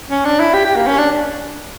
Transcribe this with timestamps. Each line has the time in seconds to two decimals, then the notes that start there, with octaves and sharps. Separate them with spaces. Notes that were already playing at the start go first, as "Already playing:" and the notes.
0.11 C#4
0.25 D4
0.40 E4
0.54 G4
0.65 G4
0.76 A#3
0.87 C#4
0.98 D4